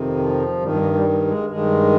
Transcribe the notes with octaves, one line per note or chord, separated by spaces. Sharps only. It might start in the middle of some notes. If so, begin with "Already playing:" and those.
Already playing: F2 C3 D#3
F3
G2 D#3 G3
G3
G3
G3
G#3
G2 D#3 G#3